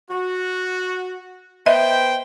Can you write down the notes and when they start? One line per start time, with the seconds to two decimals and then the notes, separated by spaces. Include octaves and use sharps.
0.10 F#4
1.66 B3 C5 D#5 E5 G5